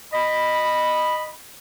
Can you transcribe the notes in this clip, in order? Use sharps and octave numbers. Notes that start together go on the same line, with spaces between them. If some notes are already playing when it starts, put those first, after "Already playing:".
D#5 B5